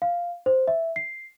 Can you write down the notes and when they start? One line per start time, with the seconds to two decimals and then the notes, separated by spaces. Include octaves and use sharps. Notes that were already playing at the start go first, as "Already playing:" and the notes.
0.02 F5
0.46 C5
0.68 E5
0.96 C7